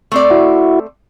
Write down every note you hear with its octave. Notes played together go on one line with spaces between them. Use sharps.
A3 C4 D5
E4 F#4